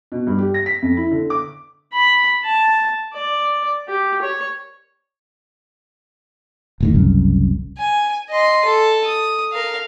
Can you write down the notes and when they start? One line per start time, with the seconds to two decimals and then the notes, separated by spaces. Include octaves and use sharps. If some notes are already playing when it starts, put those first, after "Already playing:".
0.12 B2
0.27 G2
0.38 G4
0.54 A#6
0.66 B6
0.82 F2
0.97 E4
1.11 D3
1.30 D6
1.93 B5
2.45 A5
3.13 D5
3.88 G4
4.22 C#5
6.80 E1 A2 D#3
6.94 F#1 C2 F#2
7.78 G#5
8.30 D#5 C6
8.65 A4
9.05 D#6
9.52 A#4 F5